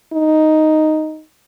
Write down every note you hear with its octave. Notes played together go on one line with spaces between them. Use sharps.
D#4